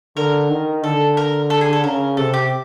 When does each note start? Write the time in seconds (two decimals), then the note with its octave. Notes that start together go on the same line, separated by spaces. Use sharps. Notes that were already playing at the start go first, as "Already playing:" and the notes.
0.17 D3 A#4
0.50 D#3
0.83 D3 A4
1.17 A#4
1.50 A4
1.61 G#4
1.73 A4
1.84 C#3 A#4
2.17 C3 A4
2.34 G4